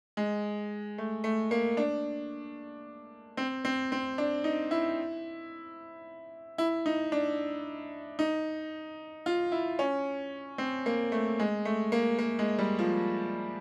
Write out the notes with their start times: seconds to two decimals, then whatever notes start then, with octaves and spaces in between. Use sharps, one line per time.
0.17 G#3
0.98 A3
1.24 A3
1.51 A#3
1.77 D4
3.37 C4
3.65 C4
3.92 C4
4.18 D4
4.44 D#4
4.71 E4
6.58 E4
6.86 D#4
7.12 D4
8.19 D#4
9.26 F4
9.52 E4
9.79 C#4
10.58 C4
10.86 A#3
11.12 A3
11.40 G#3
11.65 A3
11.92 A#3
12.19 A#3
12.39 G#3
12.59 G3
12.79 F3